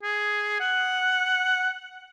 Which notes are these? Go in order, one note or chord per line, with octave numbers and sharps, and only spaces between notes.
G#4
F#5